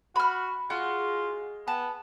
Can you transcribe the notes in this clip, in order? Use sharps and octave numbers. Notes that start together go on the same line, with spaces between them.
F#4 B5 F6
G#3 F4 F#4
B3 A5